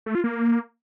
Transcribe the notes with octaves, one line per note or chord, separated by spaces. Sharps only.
A3
F4
A#3